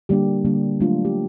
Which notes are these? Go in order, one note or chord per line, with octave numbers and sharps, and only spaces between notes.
D3 G3 A#3 D4 G4
D3 G3 A#3 D4
F#3 A3 D4 F4
G4